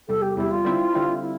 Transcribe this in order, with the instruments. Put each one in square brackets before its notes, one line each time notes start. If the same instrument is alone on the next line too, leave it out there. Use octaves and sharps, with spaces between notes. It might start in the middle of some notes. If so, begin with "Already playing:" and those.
[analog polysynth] E2 C3 G3 [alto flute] A4
[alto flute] G4
[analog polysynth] E2 C3 G3 [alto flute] E4
[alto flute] F4
[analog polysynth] D3 G3 C4 E4
D3 G3 C4 E4
[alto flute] E4